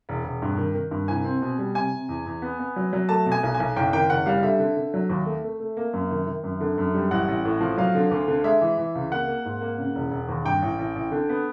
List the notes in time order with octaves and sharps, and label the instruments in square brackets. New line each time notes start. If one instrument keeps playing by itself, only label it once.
[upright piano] E1
E1
G2
D#3
D#3
G2
C2 G#5
C4
B2
G3
C3 G#5
C3
E2
E2
B3
B3
F#3
F#3
A3 A5
B2
G#5
B1
G#5
B1
F#1 G5
D#3 G5
F#1 F#5
G3 F5
D3 E5
D3
D3
F#3
D#2
A3
A3
A3
A#3
F#2
D#3
D#3
F#2
D3
F#2
G3
A1 F#5
A1
A2
F3
F#3 F5
D3
D2
D3
G#3 E5
E3
E3
C#2
A#3 F#5
A#3
G#2
A#3
C#3
E1
E1
D#2
G2 G5
A1
A1
A1
D3
B3